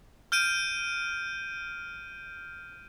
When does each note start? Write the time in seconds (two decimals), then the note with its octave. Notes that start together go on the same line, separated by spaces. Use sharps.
0.32 F6 G6 D7 D#7